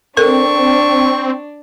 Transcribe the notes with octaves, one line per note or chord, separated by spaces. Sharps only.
C4 D4 A4 A#4 C#6